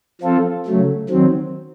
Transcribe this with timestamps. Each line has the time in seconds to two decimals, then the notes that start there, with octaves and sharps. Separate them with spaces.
0.21 F3 C4 F4 A4
0.66 C#3 F#3 A3
1.09 D#3 F#3 C4